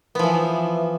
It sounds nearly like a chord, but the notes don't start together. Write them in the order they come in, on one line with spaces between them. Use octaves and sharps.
B3 F3 E3